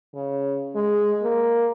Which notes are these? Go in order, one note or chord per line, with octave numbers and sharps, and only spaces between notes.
C#3
G#3
A#3